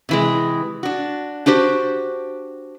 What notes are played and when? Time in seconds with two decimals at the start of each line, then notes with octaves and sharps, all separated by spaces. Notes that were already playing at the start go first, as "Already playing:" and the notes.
0.09 C3 E3 G#3
0.83 D4 F#4
1.46 D4 F#4 G4 C5